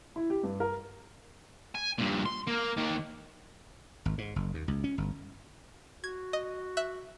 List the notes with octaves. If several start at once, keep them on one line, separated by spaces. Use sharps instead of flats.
E4
G4
G2
A#4
G#5
G2 A#2
C6
A#3
D#3 A#3
G#1
G#2
F#1
D#2
C#2
C#4
G1
F#4 G#6
D#5
E5 F#6